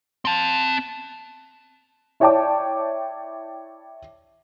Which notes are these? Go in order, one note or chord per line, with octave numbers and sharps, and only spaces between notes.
C4 A5
E4 C#5 D5 G5 A5 D6